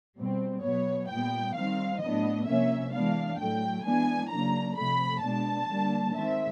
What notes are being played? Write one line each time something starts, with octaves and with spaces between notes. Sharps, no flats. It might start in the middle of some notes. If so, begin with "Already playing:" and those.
B2 G3 C4
B2 F#3 B3 C#5
A#2 G3 B3 G5
D#3 G3 C4 F5
A2 F#3 B3 D4 D#5
C3 F3 A#3 C#4 E5
E3 G#3 B3 D4 F5
A2 F#3 A3 G5
E3 G#3 B3 D4 G#5
C#3 F#3 A#3 D4 A#5
C3 F3 A3 B5
B2 G#3 B3 D4 A5
D3 G3 A#3 D4
D#3 G#3 C4 E5